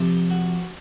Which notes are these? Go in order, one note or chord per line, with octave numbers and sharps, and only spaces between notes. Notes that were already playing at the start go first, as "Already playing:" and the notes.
Already playing: C3 F3
F#4